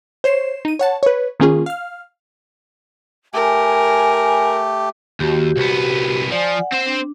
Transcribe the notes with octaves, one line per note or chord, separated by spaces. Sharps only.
C5 C#5 C7 E7
D#4 D#7
C#5 F#5 A5
B4 C#5
D#3 A#3 C#4 F4 G#4
F5 F6
A3 G4 A#4 G#5
D#2 F#4 G4
C2 B3
F3 D5 G#5
F#5
C4 C5
D4